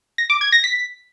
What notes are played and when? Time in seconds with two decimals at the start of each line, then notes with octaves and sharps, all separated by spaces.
0.18 A#6
0.30 D6
0.41 G#6
0.52 A#6
0.64 B6